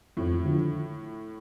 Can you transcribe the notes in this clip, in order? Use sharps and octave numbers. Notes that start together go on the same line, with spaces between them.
F2 A2
D3 F3